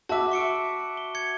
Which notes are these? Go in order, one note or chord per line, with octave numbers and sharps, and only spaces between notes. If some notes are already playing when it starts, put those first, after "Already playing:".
F#4 E5 A5 D6
C#6 C#7 D7
G7
G#6 C#7 G7